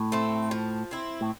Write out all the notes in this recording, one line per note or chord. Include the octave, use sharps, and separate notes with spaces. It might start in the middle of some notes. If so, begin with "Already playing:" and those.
Already playing: A2
A3 C4
F3
C4 E4
A2